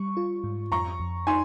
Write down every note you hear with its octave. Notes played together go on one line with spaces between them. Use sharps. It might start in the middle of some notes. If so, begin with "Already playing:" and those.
Already playing: G3 C#6
F4
G#2
F2 A#5 C#6
F2
D#4 G#5 C6